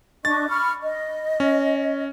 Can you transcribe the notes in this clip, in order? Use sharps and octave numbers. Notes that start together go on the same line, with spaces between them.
D4 D#5 C#6 A6
B5 C#6 F6
D#5
C#4